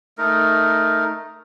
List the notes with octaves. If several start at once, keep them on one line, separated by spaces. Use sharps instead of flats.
A3 D#4 A#4